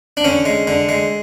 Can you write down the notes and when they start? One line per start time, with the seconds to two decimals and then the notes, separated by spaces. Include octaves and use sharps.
0.17 D4
0.24 D3 C#4
0.45 G#3
0.67 D3
0.89 G#3